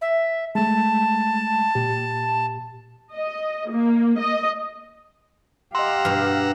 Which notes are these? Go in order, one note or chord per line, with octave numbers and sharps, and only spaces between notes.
E5
G#3 A3 A5
A#2 G4
D#5
A#3
D#5
G4 D#5 F5 F#5 A#5 C6 E6
G2 B2 F6